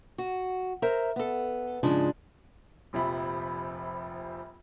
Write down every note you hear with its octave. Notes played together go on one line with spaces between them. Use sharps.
F#4
A#4 C5 E5 A#5
B3 A4
G#2 C#3 F3 G#3 D4
F1 A#1 C3 F3 B5